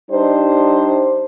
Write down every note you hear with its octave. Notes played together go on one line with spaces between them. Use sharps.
G3 D4 D#4 C5